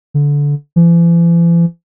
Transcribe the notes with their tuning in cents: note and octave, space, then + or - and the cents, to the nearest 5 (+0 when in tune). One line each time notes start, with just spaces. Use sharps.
D3 -20
E3 +45